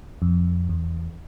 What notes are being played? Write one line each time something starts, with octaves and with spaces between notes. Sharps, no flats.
F2
E2